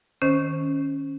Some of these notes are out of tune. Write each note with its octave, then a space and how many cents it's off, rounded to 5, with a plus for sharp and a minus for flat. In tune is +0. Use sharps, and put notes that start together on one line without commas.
D#3 +0 C#4 +0 C5 +0